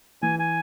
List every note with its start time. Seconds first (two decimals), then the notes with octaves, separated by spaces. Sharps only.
0.22 E3 G#5
0.39 G#5